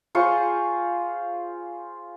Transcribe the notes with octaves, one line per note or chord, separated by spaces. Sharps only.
F4 G#4 C5 C#6